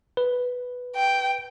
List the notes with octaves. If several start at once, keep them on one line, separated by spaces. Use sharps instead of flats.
B4
G5